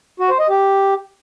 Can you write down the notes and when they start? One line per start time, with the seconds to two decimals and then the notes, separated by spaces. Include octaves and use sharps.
0.20 F#4
0.30 C5
0.40 D#5
0.49 G4